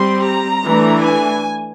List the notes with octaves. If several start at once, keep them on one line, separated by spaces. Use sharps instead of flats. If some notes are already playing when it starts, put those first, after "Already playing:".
Already playing: G3 C4 C6
A#5
E3 A3 D4
G#5